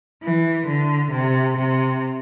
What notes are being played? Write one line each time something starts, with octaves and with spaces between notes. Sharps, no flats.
E3
D3
C3
C3